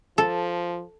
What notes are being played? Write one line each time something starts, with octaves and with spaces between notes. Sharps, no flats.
F3 A4